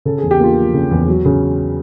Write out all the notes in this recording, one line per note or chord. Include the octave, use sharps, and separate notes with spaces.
C#3 A4
E2 G#4
G4
A#3 F4
F3
C#3
E2
F#3
C#3